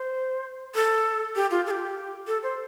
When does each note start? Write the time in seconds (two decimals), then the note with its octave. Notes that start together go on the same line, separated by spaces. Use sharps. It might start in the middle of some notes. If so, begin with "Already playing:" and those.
Already playing: C5
0.75 A4
1.36 G4
1.51 F4
1.67 A4
1.71 G4
2.27 A4
2.43 C5